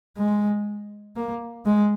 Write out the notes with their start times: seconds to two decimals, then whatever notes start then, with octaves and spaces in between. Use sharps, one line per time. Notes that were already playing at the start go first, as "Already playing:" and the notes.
0.17 G#3
1.16 A#3
1.66 G#3